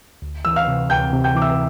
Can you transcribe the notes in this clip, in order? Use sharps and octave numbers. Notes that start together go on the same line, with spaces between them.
D2
E3 E6
F5 F6
C3
D2 G5 G6
C3
G5 G6
E3 D6
E5 E6